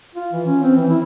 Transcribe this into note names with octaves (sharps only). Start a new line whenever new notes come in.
F4
E3
C#4
C4
E3
E4